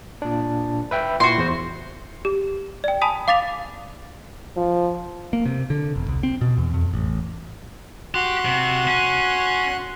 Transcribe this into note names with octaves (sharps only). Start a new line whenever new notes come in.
A#2 D4
B4 E5 G5
A#2 E4 F#4 C6
E2 C5
G4
D5 G5
G#5 A5 B5 D#6 B6
F5 D6 A6 B6 F7
F3
A#3
C3
D3
E1
C2
C4
B2
E2
F2
A1
F#4 G4 C6 F#6
C3
C#4